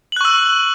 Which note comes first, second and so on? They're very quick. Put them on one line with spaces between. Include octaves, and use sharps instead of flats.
F#7 F#6 C#6 E6